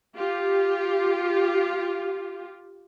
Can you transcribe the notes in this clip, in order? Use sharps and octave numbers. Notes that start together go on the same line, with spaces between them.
F4 G4